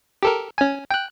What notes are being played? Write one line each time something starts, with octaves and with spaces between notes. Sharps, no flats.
G4 A4 A#4
C#4 G#5
G5 F#6